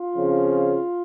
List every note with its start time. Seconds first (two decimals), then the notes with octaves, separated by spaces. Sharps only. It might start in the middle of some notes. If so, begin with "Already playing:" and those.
Already playing: F4
0.15 F2 C#3 F3